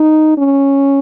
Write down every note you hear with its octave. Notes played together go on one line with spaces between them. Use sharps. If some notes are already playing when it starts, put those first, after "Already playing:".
Already playing: D#4
C#4